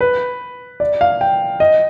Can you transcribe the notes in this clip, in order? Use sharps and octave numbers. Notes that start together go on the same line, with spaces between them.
B4
D5
F5
G5
D#5